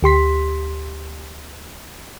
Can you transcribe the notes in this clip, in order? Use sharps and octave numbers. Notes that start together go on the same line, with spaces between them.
D2 G4 C6 B6